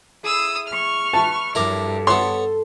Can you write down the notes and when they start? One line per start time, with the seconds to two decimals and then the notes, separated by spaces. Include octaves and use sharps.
0.23 E4 G#4 D#6 E6
0.68 C#6 F6
1.13 B4 A5
1.55 G2 F3 F#3 E4 A4 A#4 D6
2.07 B3 A4 C#5 C6